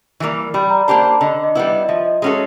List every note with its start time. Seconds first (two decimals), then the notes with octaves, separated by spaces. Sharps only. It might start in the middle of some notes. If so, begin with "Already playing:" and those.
0.20 E3 G3 A#3
0.54 G3 B5
0.70 A#5
0.87 A#3 D4 G4 C5 A5
1.05 A5
1.21 D3 D#5
1.44 D#5
1.55 G3 B3 E4
1.66 D#5
1.83 D#5
1.89 F3 E5
2.05 D#5
2.22 G#3 C#4 F#4 A4